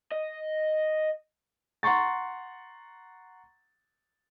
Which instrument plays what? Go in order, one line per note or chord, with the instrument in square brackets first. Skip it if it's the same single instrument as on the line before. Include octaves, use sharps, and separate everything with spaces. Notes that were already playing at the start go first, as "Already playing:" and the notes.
[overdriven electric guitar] D#5
[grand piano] F#5 A#5 C6 C#6 A6